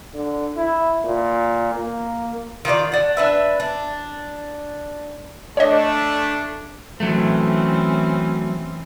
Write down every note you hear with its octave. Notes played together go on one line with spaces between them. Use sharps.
D3
E4
A#2
A#3
D#3 F4 C5 D5
D4 F#5
D4 B4 E5
D4
A3 D4 C#5 D#5
E3 F#3 A3 C4 C#4